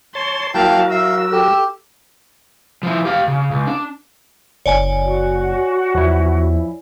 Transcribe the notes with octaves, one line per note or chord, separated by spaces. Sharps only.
C#5 A5 C6
F#3 A#3 E4 F#4 A#4 F5 G5 A5
E5 F5 E6
G4 A4
F3 E4
G4 F5
C#3
C#2
D4
F#1 C#5 D5 G#5
F#4
E2 F3 E4